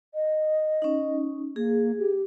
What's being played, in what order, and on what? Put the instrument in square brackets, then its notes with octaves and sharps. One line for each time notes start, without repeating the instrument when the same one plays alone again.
[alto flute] D#5
[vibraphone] C#4 D#4
[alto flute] A#3 [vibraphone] G#4
[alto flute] G4